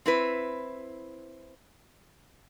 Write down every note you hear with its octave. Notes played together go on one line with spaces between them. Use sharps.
C4 E4 B4